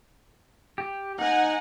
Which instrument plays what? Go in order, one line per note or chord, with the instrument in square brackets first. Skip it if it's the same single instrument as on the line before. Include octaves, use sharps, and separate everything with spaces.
[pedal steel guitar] G4
[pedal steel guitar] D#4 [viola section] F#5 G#5 A#5